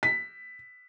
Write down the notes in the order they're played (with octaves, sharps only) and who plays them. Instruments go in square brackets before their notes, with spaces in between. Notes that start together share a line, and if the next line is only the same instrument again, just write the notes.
[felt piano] B6